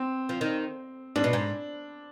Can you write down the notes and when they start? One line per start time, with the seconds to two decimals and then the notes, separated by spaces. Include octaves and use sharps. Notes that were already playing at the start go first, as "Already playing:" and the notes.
Already playing: C4
0.29 F3
0.41 D#3
1.16 G#2 D4
1.24 B2
1.33 G#2